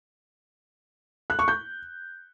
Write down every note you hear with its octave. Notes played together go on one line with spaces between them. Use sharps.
F#6
C#6
G6